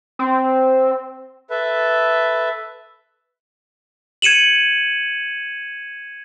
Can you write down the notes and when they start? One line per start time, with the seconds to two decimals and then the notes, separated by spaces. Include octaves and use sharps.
0.19 C4
1.50 A4 B4 E5
4.22 G#6 C#7 D#7 E7 F#7